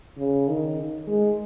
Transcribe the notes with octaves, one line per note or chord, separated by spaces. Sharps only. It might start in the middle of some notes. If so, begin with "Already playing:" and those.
C#3
D#3
G#3